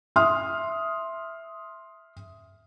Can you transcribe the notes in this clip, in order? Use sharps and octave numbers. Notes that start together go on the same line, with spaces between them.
E5 C6 D#6 F6